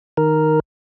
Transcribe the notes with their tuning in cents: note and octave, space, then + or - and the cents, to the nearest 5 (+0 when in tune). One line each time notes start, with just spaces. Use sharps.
D#3 -5 A#4 +0